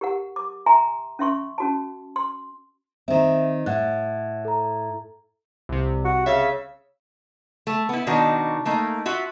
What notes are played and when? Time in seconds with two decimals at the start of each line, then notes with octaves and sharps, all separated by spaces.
0.01 G4 A#4 F#5
0.36 D6
0.66 E5 G#5 A#5 C6
1.19 C#4 E5 C6 C#6
1.58 C#4 F#4 A5
2.16 C6
3.08 D#3 C4 E5
3.66 A2 E5 F#5 F#6
4.45 A4 A#5
5.69 C2 C3
6.05 F#4
6.26 C#3 E5 F5 E6
7.67 A3
7.89 B3 E4
8.07 B2 D#3 D4 D#4 F#4
8.65 A3 A#3 D#4
9.05 F4 F#4 E5